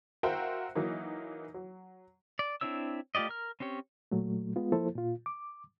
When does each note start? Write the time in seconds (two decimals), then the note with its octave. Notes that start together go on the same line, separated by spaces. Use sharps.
0.23 F#4 A#4 C5 E5 F5 G5
0.75 E3 F#3 A#3 D#4
1.54 F#3
2.39 D5
2.61 C4 D4 E4 C#5 E6
3.15 A3 F4 G4 D5 D#5
3.29 A#4 F6
3.60 C4 C#4 G4 C#5
4.12 A#2 F#3 A3
4.56 G#3 B3 F4
4.72 F3 A#3 E4 A4 C5
4.95 A#2 F4
5.26 D6